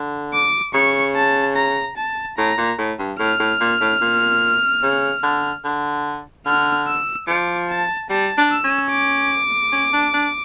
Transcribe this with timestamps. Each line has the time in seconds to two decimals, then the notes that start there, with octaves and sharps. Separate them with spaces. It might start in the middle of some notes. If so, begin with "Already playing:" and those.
Already playing: D3
0.33 D6
0.74 C#3 C#6
1.15 A5
1.56 A#5
1.97 A5
2.38 A2 A#5
2.58 A#2
2.78 A2
2.99 G2
3.19 A2 F6
3.40 A2
3.60 A#2
3.81 A2
4.01 A#2
4.83 C#3
5.23 D3
5.64 D3
6.46 D3 F6
6.88 E6
7.28 F3 D6
7.69 A5
8.10 G3 A5
8.37 D4
8.50 E6
8.64 C#4
8.91 D6
9.72 C#4
9.93 D4
10.13 D4